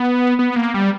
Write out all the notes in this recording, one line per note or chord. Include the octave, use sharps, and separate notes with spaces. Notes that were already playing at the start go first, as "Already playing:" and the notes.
Already playing: B3
B3
A#3
G3